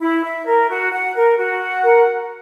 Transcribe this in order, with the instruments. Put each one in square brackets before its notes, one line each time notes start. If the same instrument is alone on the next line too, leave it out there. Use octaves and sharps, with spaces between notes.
[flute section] E4
E5
A#4
F#4
F#5
A#4
F#4
F#5
A#4